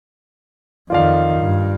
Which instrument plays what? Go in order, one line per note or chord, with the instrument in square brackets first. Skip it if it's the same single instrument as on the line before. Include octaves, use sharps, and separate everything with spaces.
[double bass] F2 D#3 [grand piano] F4 D5 F5
[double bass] G2